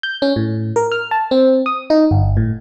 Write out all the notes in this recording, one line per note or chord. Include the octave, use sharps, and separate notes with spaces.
G6
C#4
A2
A#4
F6
A5
C4
D#6
D#4
G1
A2